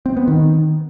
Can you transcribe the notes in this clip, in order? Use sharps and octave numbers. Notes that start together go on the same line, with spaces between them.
C4
B3
D#3